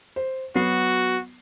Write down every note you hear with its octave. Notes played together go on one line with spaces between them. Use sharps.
C5
F#3 B3 F#4 C7